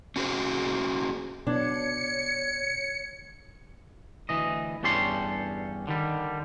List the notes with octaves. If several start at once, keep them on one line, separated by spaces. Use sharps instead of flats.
C#4 F#4 G#4 C5
B2 D4 C#5 G#6 C#7
D2 E3 D#5
E2 G2 C#4 G4 A4 C6
D3 D#3 G3